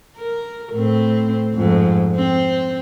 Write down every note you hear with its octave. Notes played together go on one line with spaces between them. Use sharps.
A#4
A2 C4
F2 G#2
C4